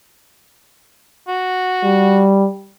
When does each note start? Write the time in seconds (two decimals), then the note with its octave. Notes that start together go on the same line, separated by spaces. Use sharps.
1.28 F#4
1.84 G3